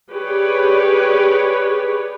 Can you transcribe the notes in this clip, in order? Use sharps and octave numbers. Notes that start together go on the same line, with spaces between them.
G4 G#4 B4 C#5 D5